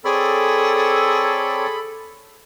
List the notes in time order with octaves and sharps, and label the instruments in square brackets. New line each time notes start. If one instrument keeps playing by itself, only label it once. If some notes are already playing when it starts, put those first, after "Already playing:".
[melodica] C4 C#5 D5 [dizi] G#4 [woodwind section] A4 [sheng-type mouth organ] B5